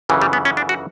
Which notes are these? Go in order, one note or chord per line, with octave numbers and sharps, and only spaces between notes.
G1 F#2 C#3 E3 G3
G3
B3
C#4
D4
F#4